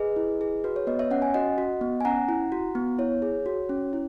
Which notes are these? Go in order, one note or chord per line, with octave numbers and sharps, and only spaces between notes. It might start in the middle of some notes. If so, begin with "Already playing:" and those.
Already playing: G#4 B4 D#5
E4
G#4
F#4 B4
C#5
B3 B4 D#5
C#5 E5
C#4 F#5
G#5
F#4 D#5 F#5
F#4
B3
G#5
C#4 F#5 A#5
E4
F#4
B3
E4 C#5
G#4
F#4
C#4
E4